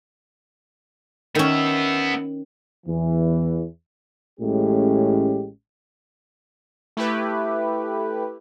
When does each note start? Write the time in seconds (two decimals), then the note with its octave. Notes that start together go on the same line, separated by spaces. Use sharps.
1.35 D#3 B3 C#4 E5
2.86 E2 E3
4.40 A1 A2 G#3 C#4 G4
6.97 A3 E4 G4 B4